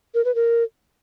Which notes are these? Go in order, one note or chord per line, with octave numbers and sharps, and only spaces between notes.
A#4
B4
A#4